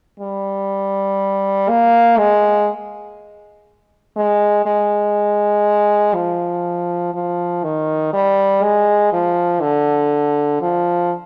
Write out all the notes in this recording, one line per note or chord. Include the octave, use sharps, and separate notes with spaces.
G3
A#3
G#3
G#3
G#3
F3
F3
D#3
G3
G#3
F3
D3
F3